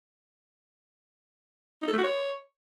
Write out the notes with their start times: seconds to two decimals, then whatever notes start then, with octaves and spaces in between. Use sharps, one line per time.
1.82 D#4
1.87 A4
1.93 A3
1.98 F#4
2.04 C#5